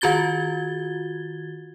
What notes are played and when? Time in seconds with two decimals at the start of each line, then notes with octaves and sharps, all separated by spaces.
0.01 D#3 F4 F#4 G#6 A6 G7